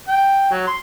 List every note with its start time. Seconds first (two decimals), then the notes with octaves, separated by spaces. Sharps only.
0.08 G5
0.51 F#3
0.67 C6